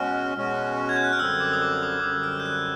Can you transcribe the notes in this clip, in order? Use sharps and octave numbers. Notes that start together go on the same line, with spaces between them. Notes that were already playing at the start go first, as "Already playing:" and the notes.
Already playing: B2 G#3 C#4 F#4 F6
B2 G#3 C#4 F#4
G#6
G6
F#6
F6
F#2 D3 G3 C4 E6
D6
D#6
D6
D#6
D6
F#2 D3 G3 C4 D#6
F6
G6
F#6